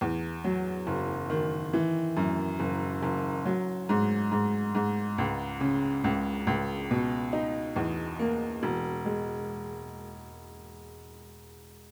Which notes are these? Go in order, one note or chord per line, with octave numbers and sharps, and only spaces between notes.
E2
F#3
F#1
D#3
E3
F#2
F#1
F#1
F#3
G#2
G#2
G#2
C#2
C#3
C#2
C#2
B2
D#4
E2
A#3
E1
G#3